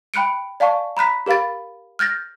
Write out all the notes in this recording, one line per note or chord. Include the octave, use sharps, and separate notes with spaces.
G5 B5 F#6 C#7 D7
D5 F5 G#5 A5 C#6
A#5 B5 F#6 B6
G4 A#4 F5 B5 A6
F6 G6 A6 A#6